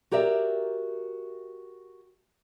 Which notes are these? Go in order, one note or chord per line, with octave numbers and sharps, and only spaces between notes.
F#4 G4 A#4 D5 E5